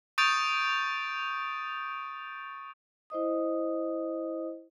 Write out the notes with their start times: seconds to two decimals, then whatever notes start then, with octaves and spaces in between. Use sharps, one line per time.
0.18 C#6 D#6 G6 A6 D7 F7
3.10 E4 C5 D#5 D#6